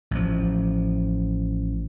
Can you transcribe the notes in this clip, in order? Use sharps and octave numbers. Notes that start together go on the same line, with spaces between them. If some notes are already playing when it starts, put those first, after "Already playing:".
A1 F3